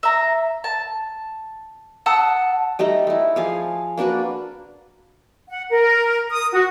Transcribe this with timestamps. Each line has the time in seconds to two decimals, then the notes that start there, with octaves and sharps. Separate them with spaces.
0.03 E5 A#5
0.64 A5
2.06 F#5 A5 D#6 E6
2.79 G3 A3 D#4 A#5
3.07 A3 E4
3.36 F3 G#4 F5
3.98 A#3 D4 F#4 B4
5.49 F#5
5.70 A#4
6.30 D#6
6.52 F#4